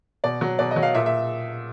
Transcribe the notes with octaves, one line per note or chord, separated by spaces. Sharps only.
B2 D5
F#3
B2 D5
D#5
F#3
F5
A#2 E5
E5